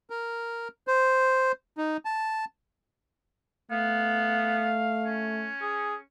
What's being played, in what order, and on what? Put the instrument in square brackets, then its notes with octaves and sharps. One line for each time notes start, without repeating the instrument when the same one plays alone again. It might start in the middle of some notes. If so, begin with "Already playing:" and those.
[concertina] A#4
C5
D#4
A5
[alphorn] A3 [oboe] B3 [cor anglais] F5
[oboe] C#4
[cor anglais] G#4